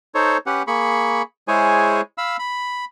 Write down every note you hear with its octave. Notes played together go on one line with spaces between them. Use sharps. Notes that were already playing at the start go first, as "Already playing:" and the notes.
D#4 A4 C5 C#5
C#4 G4 B4 F#5
A#3 G#4 B5 C#6
G#3 E4 G#4 C5 C#5 G#5
F5 B5 E6
B5